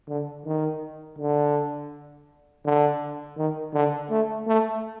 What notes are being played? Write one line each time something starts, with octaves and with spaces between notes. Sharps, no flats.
D3
D#3
D3
D3
D#3
D3
A3
A3